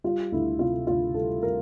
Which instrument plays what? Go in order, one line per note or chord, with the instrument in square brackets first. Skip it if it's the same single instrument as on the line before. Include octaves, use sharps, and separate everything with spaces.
[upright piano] G3 F4
D2 E4
C3 F4
D2 F4
G3 A4
G3 A#4